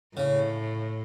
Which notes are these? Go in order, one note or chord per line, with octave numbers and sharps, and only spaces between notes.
A2 C#3